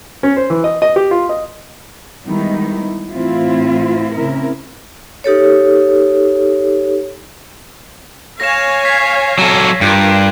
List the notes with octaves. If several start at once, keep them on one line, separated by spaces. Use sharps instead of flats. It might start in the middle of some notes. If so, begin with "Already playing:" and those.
C#4
C5
E3
D#5
D#5
G4
F4
D#5
D#3 G3 G#3 B3 D#4 E4
A2 E3 C4 E4 F4
C#3 C4 E4 A#4
D#4 G4 A4 C#5
C#5 F5 G#5 A#6 E7
G#6 B6 C7
F#3 A4
G2 F4 A#4 F#6 G6 D7